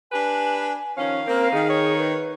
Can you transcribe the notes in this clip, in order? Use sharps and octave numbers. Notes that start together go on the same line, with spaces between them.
D4 G4 B4 G#5
D#3 F3 C#4 F5
A#3 C4 A#4
D#3 G#4
C#5
B4